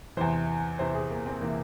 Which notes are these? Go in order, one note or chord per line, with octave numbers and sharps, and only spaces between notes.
E2 C3 E3 C5
E2 C3 E3 C5
G#4
A#3
C4
C3 E3 A#3